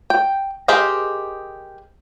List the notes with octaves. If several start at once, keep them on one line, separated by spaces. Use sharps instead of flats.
G5
G4 G#4 A#4 C5 D#5